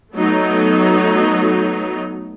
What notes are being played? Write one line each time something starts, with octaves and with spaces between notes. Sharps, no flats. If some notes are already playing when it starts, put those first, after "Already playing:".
F#3 A3 B3 D#4